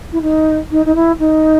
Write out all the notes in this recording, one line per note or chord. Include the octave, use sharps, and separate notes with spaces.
E4
D#4
D#4
D#4
E4
D#4